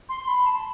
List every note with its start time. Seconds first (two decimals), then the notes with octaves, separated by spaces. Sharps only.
0.09 C6
0.21 C6
0.28 B5
0.46 A5